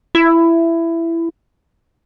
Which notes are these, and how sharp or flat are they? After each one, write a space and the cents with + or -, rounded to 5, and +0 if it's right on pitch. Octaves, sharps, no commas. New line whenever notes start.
E4 +15